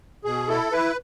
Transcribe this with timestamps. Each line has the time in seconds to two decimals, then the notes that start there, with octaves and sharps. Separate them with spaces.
0.24 B2 G#4
0.48 E4 A4
0.72 E4 B4